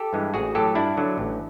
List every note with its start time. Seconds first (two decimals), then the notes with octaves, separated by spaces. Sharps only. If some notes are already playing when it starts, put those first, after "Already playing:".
Already playing: G4 A4
0.13 G2 E3 G#3
0.34 A1 F#4 G#4
0.55 A2 F#3 G4 A4
0.75 G2 D4 E4
0.97 D3 F#3
1.18 A1